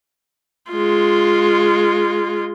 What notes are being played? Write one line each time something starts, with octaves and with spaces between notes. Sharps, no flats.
G#3 F4